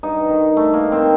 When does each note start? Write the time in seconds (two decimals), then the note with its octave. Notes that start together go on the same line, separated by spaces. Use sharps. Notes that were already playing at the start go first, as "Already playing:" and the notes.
0.03 G2 D#4
0.30 D#3
0.56 G2 A3
0.74 A#3
0.83 D#3
0.92 C4